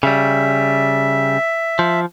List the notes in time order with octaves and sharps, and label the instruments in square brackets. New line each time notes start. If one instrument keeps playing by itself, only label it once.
[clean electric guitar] C#3 G3 [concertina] E5
[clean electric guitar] F3